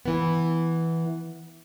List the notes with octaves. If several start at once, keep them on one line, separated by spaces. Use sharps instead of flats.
E3 B3